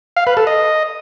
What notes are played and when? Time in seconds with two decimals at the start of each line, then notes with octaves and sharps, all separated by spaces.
0.17 F5
0.27 B4
0.37 A4
0.47 D#5